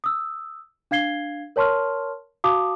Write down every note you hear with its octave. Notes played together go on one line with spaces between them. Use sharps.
D#6 E6
D4 F5 G#6 C7 G7
A#4 C#5 A5 C6 C#6 F6
F#4 F5 A5 D6 D#6